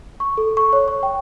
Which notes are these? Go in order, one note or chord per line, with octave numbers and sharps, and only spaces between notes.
C#6
A4
C#6
C#5
C#6
G5